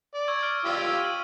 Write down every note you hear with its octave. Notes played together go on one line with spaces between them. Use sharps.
D5
C#6 E6 G#6
F6 D7
F4 G4 E6
D#7 F#7